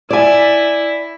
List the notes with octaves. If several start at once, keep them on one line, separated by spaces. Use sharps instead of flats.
E4 D5 G#5